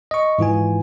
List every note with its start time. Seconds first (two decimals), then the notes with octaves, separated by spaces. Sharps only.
0.11 D#5 C#6
0.38 G#2 E3 F4 G#5